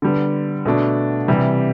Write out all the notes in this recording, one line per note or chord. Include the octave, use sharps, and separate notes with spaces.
D3 G3 B3
B2 A3 D4
C3 E3 G3